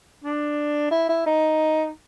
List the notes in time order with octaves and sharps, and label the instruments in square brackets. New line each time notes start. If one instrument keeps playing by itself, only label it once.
[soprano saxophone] D4
E4
E4
D#4